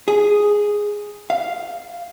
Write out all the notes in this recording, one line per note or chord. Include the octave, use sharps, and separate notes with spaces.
G#4
F5